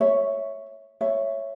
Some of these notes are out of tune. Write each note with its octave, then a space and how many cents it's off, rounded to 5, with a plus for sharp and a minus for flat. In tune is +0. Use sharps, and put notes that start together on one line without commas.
C#5 +0 E5 -5
C#5 +0 E5 +10